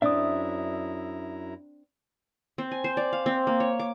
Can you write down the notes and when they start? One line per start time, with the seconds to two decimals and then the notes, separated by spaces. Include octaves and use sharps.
0.02 F#2 C4 D4 E4 E5 A#5 D#6
2.58 C4
2.71 G#5
2.84 C5
2.97 D5
3.13 F5
3.26 C4
3.47 A#3
3.60 C#5
3.79 D6